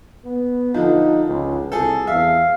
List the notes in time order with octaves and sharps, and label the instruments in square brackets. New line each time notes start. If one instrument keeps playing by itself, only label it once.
[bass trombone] B3
[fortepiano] D3 F3 [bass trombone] D#4
[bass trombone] C#2
[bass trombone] C2 [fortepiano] G#4 A4
[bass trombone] E2 [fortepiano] E5 [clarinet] F5